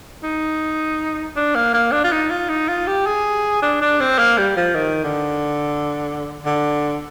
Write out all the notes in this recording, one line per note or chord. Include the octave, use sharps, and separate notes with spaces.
D#4
D4
A#3
A#3
D4
F4
D#4
F4
D#4
F4
G4
G#4
D4
D4
C4
A#3
G3
F3
D#3
D3
D3